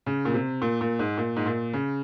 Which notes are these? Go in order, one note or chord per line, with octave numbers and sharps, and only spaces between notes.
C#3
A#2
C3
A#2
A#2
G#2
A#2
G#2
A#2
C#3